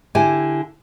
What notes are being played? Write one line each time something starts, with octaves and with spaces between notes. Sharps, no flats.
D3 E4 G4 G#5